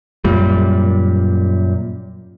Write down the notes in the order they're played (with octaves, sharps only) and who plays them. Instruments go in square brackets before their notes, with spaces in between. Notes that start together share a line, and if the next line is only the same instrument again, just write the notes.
[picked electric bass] F#2 A#2 G3